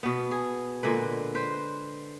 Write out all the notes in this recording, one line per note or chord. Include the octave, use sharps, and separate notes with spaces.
B2 B3
G#4
A#2 D3 G#3 B4
B4 C5